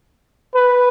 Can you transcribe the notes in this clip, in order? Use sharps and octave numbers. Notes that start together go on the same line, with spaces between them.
B4